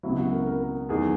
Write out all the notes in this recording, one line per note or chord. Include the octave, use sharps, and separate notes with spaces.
C#2 B2 F#3 E4
F#4
A#4
A#4
E2 D#3 F#3 G#4